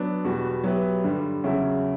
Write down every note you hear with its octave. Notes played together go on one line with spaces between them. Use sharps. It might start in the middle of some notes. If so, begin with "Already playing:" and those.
Already playing: F#3 B3 D4
E2 B2 G3 B3 F#4
F#3 B3 E4 G4 B4
G2 D3 G3
E2 C#3 F#3 C#4 E4